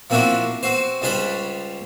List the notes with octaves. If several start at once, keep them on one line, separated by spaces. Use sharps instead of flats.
F3 A#3 C4 D4 E4 F#4
C4 F#4 C5
C#2 G3 C#4 D4 C5 B5